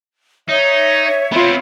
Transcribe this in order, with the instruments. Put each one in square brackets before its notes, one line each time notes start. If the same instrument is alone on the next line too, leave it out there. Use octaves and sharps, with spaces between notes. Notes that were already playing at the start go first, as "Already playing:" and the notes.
[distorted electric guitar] D#4 [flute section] C#5 E5
[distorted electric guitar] B3 C4 [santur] F4 B5